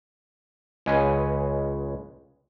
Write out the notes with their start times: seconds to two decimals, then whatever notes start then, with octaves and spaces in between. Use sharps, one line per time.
0.86 C#2 G#3 C#4 B4 D#5 G#5